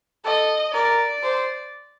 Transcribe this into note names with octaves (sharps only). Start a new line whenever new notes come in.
A4 D#5
A#4 D5
C5